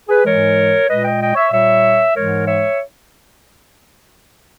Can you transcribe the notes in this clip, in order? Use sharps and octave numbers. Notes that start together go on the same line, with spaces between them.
G#4 B4
G#2 E3 G#3 A#4 C#5
A#2 G#3 B4 D#5
D#5 G5
D#5 G5
C#5 E5
A#2 G3 C#5 E5
G#2 E3 G#3 A#4 C#5
C#5 E5